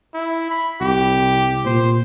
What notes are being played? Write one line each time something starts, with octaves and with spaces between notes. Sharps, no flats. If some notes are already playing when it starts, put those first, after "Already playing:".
E4
B5
C2 G4
A#2 C5